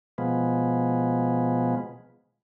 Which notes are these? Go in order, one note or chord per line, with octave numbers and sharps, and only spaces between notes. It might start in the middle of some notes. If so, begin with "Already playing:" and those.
B2 F3 G#3 B3